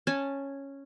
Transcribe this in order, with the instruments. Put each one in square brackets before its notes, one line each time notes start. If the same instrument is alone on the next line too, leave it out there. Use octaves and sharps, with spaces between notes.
[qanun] C#4 G#5 A5